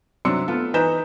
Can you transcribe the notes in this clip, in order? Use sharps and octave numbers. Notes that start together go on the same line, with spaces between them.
C3 F#3 D4 C6 E6 C#7
A3 B3 F4 A4
E3 D#4 B4 A#5 G6 E7